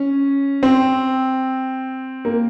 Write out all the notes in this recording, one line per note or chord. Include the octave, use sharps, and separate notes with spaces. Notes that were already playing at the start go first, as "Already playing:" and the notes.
Already playing: C#4
C4
A#3